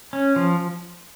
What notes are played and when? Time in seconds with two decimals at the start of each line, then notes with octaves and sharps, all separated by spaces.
0.13 C#4
0.36 F3